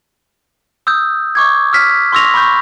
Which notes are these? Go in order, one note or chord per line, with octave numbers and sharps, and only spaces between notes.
D#6 E6 G6
C#6 D6 G#6
E6 F6 B6
C6 C#6 E6 A#6 F7
B5 C#6 G6